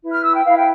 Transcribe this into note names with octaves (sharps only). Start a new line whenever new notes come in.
E4 B4
F6
E6
G5
E4 B4 F5
G5